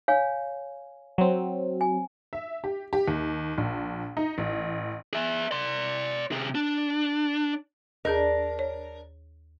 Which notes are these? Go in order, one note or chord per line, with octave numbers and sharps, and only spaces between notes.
C#5 F5 G#5
F#3 C4
G#5
E5
G4
G4
D#2
A#1
D#4
A1
G#4 E5
D5 C6
C3 G#4
D4
D#2 D4 G#4 A#4
C#5